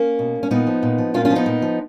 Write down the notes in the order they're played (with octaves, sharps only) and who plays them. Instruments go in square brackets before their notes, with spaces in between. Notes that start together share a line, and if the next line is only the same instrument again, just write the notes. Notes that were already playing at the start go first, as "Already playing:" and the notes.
Already playing: [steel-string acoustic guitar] A#3 C#4
B2
C#4
A#2 B3 D#4
F3
A#2
F3
A#2 C#4 F4
C#4 F4
F3
B3 D#4
A#2
F3